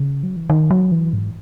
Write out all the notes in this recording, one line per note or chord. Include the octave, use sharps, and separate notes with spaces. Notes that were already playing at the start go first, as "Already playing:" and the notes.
Already playing: C#3
F#3
E3
D#3
F#3
E3
G#2